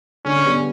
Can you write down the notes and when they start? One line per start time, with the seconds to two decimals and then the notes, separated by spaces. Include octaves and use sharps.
0.25 D3 C#4
0.45 G3 B3